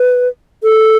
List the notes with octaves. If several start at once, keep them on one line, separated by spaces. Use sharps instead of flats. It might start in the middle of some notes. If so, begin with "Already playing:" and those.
Already playing: B4
A4